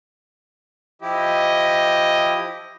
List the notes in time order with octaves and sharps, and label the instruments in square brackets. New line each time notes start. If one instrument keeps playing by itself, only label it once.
[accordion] F3 E4 G4 [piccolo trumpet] D#5